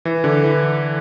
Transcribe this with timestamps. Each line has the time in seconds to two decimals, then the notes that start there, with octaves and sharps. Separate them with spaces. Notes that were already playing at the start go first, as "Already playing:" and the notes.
0.05 E3
0.24 D3
0.43 E3